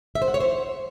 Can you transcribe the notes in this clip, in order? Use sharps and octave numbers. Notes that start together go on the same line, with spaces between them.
E5
C5
F#5
C#5
C5